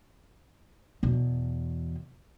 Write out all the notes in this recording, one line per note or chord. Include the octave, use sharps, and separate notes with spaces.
E2 B2